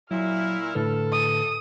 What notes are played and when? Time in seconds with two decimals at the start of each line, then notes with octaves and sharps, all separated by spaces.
0.11 A#2 F#3 E4 F6
0.75 A2 D3 A4 B4
1.12 D#6